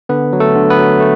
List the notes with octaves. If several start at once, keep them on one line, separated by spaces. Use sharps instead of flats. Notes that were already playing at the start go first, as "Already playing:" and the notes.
D3 B3 B4
F#3
A3 A4
D3
B3 B4
F#3
A3